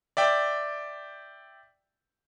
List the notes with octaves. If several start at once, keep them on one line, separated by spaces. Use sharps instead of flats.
D5 E5 G5